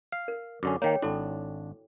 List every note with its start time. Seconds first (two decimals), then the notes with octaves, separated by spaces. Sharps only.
0.12 F5
0.28 A#4
0.63 F#2 D3 C#4 D6
0.82 D#3 A#3 C#5 G5
1.02 G#1 D4 E4 F#4 A4